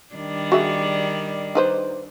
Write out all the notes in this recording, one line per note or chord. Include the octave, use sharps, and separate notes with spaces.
D#3 G3 D4
F#4 G#4 E5
D#4 B4 C5